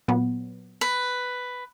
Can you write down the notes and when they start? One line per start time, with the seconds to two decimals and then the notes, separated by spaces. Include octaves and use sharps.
0.08 A#2 F#3 B3
0.81 B4